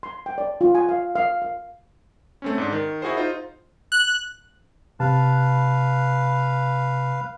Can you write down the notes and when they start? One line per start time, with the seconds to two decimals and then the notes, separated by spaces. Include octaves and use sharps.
0.03 C6
0.26 G5
0.38 D5
0.61 F4
0.75 G#5
0.89 F5
1.16 F5
1.42 F5
2.42 A3 C4 C#4
2.58 G#2 D4
2.72 D#3
3.02 E4 F#4 G#4 C5
3.17 D#4 F4 C5
3.92 F#6
5.00 C3 B4 F5 A5